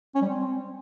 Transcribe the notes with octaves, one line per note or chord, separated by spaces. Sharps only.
C#4
G3
C4